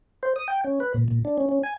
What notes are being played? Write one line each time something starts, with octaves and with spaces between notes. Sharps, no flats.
C5
D#6
G5
C#4
B4
A#2
A#2
D4
C#4
C#4
G#5